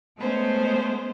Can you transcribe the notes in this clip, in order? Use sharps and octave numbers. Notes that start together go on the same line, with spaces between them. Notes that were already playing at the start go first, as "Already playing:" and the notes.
G#3 A3 B3 C#4 C5